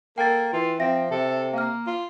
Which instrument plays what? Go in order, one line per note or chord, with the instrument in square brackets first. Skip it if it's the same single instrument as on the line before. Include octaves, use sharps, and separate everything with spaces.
[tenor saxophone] A#3 [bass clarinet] A4 [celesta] G5 A6
[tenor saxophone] E3 [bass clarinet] F4
[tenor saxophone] F3 [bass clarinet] C4 [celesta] E5 A#6
[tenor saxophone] C3 [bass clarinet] A4
[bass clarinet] A#3 [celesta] F5 F6
[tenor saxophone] F4